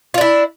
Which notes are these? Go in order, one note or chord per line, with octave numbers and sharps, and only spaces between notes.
D4 E4 F4